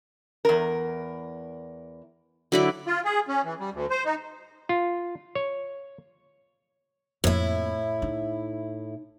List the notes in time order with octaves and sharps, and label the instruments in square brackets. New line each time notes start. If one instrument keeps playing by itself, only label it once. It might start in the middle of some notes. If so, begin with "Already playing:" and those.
[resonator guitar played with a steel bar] E2 A#4
[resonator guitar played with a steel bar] D3 [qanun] F#3 E4 D5
[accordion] F4
G#4
C#4
E3
G3
D2
C5
D#4
[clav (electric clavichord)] F4
C#5
[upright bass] F2 A#3 [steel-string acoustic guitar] A2 E4
[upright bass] D#4